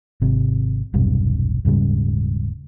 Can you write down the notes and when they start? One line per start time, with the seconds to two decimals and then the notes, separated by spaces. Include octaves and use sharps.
0.22 G#1 C3
0.94 E1 B1 G2 C3
1.65 D#1 G#2 C#3 G3